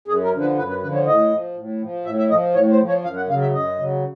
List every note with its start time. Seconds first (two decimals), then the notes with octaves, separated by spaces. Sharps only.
0.08 F#2 G#4
0.24 A#4
0.33 D3 F3
0.41 B4
0.58 F#2 B4
0.69 B4
0.83 D3 F3 B4
0.94 C#5
1.07 A2 D#5
1.31 F3
1.57 A2
1.81 F3
2.05 A2 E5
2.19 E5
2.30 F3 D#5
2.55 A2 C#5
2.71 C5
2.80 F3
2.88 C#5
3.04 F#2 F5
3.16 F#5
3.28 C#3 F#3 F5
3.41 E5
3.53 F#2 D#5
3.79 C#3 F#3